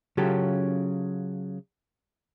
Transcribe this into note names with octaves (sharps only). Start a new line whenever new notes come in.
C#3 F#3 C#4 F4 G4 A4